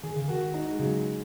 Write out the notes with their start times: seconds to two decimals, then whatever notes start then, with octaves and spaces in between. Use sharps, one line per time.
0.03 D#3 G#4
0.16 C#3
0.28 D#3 F#4
0.54 D#4
0.72 G#3
0.79 C#3 F#3